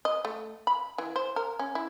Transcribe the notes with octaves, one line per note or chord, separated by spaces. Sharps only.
D#5
A3
B5
E3
C5
A#4
C#4
E4